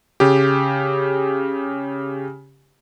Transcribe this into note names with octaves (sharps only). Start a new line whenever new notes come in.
C#3 G4